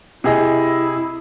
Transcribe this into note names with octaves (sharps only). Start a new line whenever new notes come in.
C3 E4 G#4 D#5